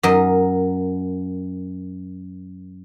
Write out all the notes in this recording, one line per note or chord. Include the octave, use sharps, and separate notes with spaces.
F#2 A#4 D#5